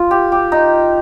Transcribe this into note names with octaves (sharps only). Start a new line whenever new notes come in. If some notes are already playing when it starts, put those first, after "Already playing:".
Already playing: F4
G4
G4
D#4